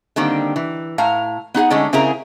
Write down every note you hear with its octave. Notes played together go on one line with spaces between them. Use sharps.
D3 D#3 G3 A#3 C4
E3
A2 F5 A#5
B3 D#4 G#4 F#5
D3 G#3 A3 C#4 D#4
C#3 C4 E4 G#4 A#4 A#5